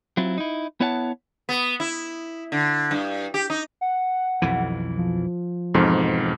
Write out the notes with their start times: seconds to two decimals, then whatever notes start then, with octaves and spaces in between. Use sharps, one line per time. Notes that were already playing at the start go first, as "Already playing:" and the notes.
0.17 F#3 C4 E4 F4
0.38 D#4 E4
0.80 B3 E4 C#5 F#5 G#5 A5
1.49 B3
1.80 E4
2.52 D3
2.91 G2
3.34 G4
3.50 D#4
3.81 F#5
4.42 B1 F2 E3
4.97 F3
5.74 E1 F2 G#2